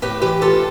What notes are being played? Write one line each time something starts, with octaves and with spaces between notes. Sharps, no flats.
A2 G4 B4
E3 G4 B4
A2 F4 A4